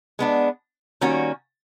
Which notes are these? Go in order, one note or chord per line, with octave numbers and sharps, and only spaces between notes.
G#3 B3 D4
D#3 G3 A#3 C#4 F#4